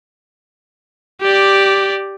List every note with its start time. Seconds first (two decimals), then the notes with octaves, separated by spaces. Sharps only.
1.22 G4 D5